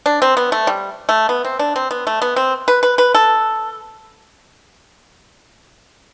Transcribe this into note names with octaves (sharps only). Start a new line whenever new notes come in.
D4
C4
B3
A3
G3
A3
B3
C4
D4
C4
B3
A3
B3
C4
B4
B4
B4
A4